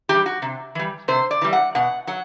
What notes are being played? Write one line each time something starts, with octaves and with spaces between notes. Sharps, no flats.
E3 G3 G4
F#4
C3
E3 G3
C3 C5
D5
E3 G3
F#5
B2 F#5
F#3 F#5